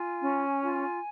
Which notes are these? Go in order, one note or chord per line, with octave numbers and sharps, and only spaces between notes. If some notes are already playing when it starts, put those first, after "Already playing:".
Already playing: F4 G#5
C#4
F4